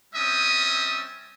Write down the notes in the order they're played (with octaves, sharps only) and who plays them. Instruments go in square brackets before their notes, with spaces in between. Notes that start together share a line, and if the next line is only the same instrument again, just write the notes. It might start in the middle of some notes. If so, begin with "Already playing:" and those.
[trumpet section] G3 C4 C#4 D#5 E5 D#6